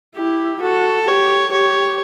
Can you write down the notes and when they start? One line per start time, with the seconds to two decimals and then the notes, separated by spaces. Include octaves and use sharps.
0.16 E4 G4
0.62 F#4 A4
1.07 G4 C#5
1.52 G4 C#5